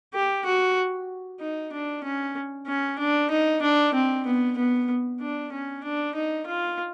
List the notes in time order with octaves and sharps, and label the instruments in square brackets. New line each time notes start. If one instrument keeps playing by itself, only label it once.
[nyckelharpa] G4
F#4
D#4
D4
C#4
C#4
D4
D#4
D4
C4
B3
B3
D4
C#4
D4
D#4
F4